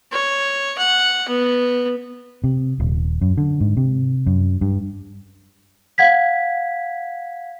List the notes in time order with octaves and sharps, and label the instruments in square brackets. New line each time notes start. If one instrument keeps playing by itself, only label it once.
[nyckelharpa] C#5
F#5
B3
[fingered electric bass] C3
D#1
F#2
D3
G#2
C3
F#2
G2
[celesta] F5 F#5 G#6 B6